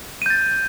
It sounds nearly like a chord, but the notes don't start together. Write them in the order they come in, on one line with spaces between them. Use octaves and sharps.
D#7 G6 A6